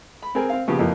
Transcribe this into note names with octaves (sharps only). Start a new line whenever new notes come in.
B5
C4 G#4 A#4 G#5
C4 F5
A#2 C#3 F3 B3 G4
F2 E3 F3 A#3